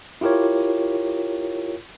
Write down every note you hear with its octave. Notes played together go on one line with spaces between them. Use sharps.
E4 F4 G4 A#4 C#5